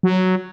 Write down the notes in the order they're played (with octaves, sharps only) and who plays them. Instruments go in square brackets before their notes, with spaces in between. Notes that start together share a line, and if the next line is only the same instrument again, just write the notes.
[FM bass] F#3